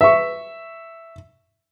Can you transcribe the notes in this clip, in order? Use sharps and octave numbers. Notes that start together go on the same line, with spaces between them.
E5 C#6